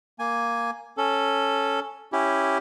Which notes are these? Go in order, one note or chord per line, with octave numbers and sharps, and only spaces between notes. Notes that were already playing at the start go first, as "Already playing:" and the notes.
A#3 G#5
C#4 A4
C#4 E4 G4